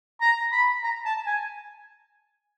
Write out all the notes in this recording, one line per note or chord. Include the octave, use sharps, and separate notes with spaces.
A#5
B5
A#5
A5
G#5